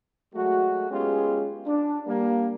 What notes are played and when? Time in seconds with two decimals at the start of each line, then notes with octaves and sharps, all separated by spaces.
0.34 F#3 G#3 A3 F#4
0.90 G#3 B3 C#4 F4 G4 G#4
1.66 D4
2.07 G3 A#3